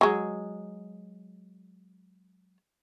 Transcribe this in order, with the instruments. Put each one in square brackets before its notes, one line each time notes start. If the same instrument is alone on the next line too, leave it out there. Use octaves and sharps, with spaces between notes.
[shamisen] F#3 G#3